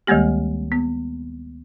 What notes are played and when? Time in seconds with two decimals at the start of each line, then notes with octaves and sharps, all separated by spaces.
0.07 D2 D#3 G3 G#3 A#3 G4
0.72 B3